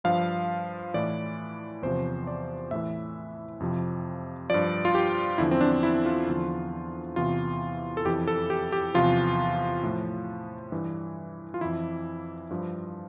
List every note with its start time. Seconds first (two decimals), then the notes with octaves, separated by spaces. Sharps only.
0.04 G2 F3 F5
0.94 A2 E3 D5
1.82 E2 C3 F3 C5
2.27 D5
2.71 A2 E3 E5
3.60 F2 C3 F3
4.50 G2 F3 D5
4.85 F4
4.95 G4
5.38 E2 D3 F3 E4
5.51 C4
5.61 D4
5.83 E4
6.06 F4
6.27 E2 D3 F3
7.16 E2 C3 E3 F4
7.97 A4
8.05 F2 E3 G4
8.28 A4
8.50 G4
8.72 G4
8.94 E2 C3 F3 F4
9.83 A2 F3
10.72 G2 E3
11.54 F4
11.61 F2 E3 E4
12.50 G2 F3